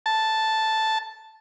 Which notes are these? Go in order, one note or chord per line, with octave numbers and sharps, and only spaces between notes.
A5